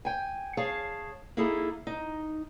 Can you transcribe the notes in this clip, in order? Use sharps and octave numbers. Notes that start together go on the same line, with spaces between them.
G5 G#5
G#4 C#5 F5 A5
A#3 D#4 E4 G#4 A4
D#4